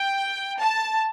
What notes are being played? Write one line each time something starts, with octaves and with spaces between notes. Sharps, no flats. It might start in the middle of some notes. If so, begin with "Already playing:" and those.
Already playing: G5
A5